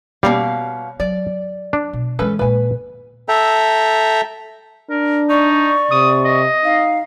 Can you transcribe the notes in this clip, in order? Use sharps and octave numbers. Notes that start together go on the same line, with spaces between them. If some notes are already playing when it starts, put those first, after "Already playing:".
B2 G3 A#3 C#4 F5
F#3 D5
D4
B2
E3 G#3 C#4 A4 B4
A#2 A#3 B4 G#5
A4 E5 G5 A#5
D4 A#4
D#4 D5 C#6
C3 D#6
D#5
D#4 F5